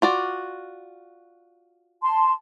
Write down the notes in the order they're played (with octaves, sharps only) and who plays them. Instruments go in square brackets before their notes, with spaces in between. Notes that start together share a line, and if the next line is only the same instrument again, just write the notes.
[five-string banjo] F4 F#4 D5
[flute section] A5 C6